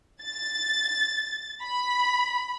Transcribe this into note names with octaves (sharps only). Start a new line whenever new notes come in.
A6
B5